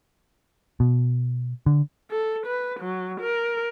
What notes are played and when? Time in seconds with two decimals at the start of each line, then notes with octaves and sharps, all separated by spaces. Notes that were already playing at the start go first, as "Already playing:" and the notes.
0.80 B2
1.66 D3
2.11 A4
2.46 B4
2.80 F#3
3.21 A#4